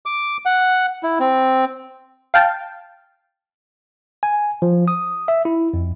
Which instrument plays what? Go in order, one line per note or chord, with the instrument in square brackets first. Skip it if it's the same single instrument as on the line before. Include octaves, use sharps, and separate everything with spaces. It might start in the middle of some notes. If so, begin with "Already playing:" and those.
[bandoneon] D6
F#5
E4
C4
[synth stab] F5 G5 A5
[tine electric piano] G#5
F3
D#6
E5
E4
F2